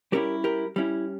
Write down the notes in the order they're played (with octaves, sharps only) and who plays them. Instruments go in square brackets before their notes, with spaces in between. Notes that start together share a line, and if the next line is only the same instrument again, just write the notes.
[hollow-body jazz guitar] G3 C#4 E4 G4 A#4
G4 A#4
G3 C#4 E4